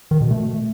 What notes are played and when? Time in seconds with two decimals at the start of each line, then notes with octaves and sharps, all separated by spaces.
0.11 D#3
0.21 B2
0.31 A3